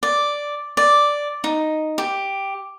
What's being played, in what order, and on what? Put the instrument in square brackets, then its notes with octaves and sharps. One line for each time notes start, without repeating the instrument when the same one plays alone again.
[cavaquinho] D5
D5
D#4
G4